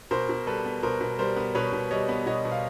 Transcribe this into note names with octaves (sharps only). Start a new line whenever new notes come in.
B2 A#4 C5
B2
G3 A4 B4
B3
B2 A#4 C5
B2
G3 A#4 C5
B3
B2 B4 C#5
B2
G3 C#5 D#5
B3
B2 C#5 D#5
B2
F5